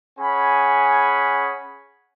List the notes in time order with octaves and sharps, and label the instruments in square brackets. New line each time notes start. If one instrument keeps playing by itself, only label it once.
[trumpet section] C#4 G#4 F#5 G#5 B5